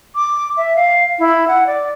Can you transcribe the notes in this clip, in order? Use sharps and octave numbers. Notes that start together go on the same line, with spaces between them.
D6
E5
F5
E4
F#5
D5